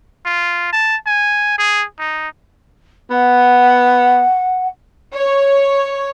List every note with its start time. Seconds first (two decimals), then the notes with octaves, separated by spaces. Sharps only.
0.25 F4
0.73 A5
1.06 G#5
1.58 G#4
1.99 D#4
3.11 B3 F#5
5.15 C#5